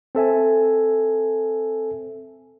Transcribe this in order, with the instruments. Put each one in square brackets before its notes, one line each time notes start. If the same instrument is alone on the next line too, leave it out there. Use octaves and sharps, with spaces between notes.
[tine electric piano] C4 A4 E5 G#5